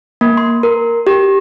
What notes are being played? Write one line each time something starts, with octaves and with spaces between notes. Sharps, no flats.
A#3
C6
A#4
G4